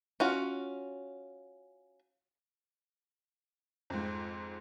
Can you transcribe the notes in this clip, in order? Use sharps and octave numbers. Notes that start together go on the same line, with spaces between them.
C#4 F4 F#4
F2 G#2